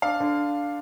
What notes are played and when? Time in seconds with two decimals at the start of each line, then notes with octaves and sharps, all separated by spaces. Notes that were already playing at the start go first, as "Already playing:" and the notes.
0.02 D4 F5
0.20 D3